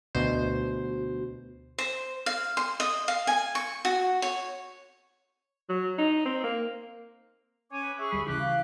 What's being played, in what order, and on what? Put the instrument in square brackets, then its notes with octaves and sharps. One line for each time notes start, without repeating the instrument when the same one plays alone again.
[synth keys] D2 B2 C5
[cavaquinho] C5
F5
C6
D#5
F5
G#5
C#6
F#4
C#5
[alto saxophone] F#3
D#4
C4
A#3
[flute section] C#4 G#5 D6 [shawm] C#5
[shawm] B4
[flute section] G#4 C#6 [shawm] E5
[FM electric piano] D2 G3 C7 [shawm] B5
[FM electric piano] C#3 E3 E4 [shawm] G4 [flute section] F#6
[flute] F5